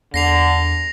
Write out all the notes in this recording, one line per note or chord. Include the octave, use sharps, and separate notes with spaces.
E2 D3 A#6 C7 F7